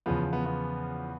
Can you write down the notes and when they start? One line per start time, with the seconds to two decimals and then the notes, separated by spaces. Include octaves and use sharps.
0.06 E2 C#3 F3 B3
0.33 B3
0.46 B3